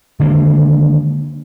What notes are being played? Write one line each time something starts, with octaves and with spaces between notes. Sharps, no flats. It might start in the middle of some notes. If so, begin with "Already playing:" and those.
D3 D#3 G#3 A#3